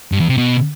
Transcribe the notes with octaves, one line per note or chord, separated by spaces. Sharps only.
G2
E2
C3
B2